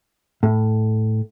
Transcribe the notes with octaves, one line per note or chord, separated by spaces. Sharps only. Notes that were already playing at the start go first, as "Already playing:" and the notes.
A2